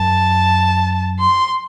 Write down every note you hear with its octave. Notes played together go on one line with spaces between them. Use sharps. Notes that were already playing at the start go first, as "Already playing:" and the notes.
Already playing: F#2 A5
C6